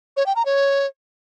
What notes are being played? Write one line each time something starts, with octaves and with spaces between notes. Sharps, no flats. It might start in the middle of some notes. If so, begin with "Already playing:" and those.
C#5
G5
A#5
C#5